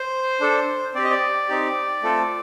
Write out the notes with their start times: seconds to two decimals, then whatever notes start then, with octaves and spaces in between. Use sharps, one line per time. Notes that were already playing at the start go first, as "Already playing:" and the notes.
Already playing: C5
0.40 D4 A4
0.95 C4 G4 D5
1.04 D#5
1.11 D5
1.49 C4 D#4 G4
2.03 A3 C4 F4 A4